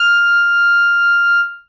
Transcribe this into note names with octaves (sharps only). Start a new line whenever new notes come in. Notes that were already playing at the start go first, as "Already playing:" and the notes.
Already playing: F6